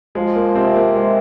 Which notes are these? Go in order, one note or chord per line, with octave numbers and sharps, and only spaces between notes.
F3 G#3
A#3
C3 C4
A#3
C3 G#3